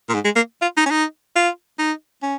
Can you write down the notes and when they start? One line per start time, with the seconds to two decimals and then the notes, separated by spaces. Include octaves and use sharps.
0.09 A#2
0.14 G#2
0.25 G#3
0.36 A#3
0.62 F4
0.77 D#4
0.86 C#4
0.91 D#4
1.36 F4
1.79 D#4
2.22 C#4